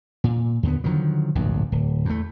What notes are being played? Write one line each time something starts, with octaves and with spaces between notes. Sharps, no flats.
A#2
D#2 D3 B3
D3 D#3 F3 F#3
D1 A#1 G2
D1
E2 A3